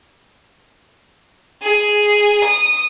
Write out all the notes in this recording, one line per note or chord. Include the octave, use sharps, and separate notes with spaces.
G#4
D#6